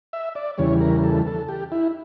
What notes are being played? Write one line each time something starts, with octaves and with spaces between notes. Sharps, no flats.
E5
D5
E2 C#3 E3 G3 C#5
A#4
A4
A4
G4
E4